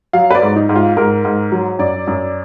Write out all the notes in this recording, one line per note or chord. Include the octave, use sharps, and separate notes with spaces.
F#3 F5
B4
D5
G#2
D#4
G#2
F4
G#2 A#4
G#2
F#3
F#2 D5
F#2